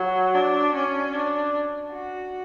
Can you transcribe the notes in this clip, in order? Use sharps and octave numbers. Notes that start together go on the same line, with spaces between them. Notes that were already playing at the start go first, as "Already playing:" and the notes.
Already playing: F#3
D4
C#4
D4
F#4